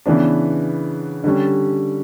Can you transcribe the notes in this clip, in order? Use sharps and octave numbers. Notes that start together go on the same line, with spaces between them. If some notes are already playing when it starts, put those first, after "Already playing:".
C#3 E3 B3 D4
D3 G3 C#4